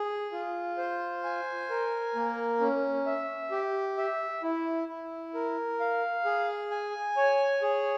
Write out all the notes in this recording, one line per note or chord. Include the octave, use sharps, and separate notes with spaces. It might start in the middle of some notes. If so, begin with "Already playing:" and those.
Already playing: G#4
F4
C5
G#5
A#4
A#3
C#4
E5
G4
E5
E4
E4
A#4
F5
G#4
G#5
C#5
G#4